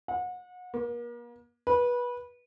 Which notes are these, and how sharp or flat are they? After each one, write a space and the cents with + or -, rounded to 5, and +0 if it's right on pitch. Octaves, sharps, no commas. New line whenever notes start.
F#5 -30
A#3 +40
B4 -20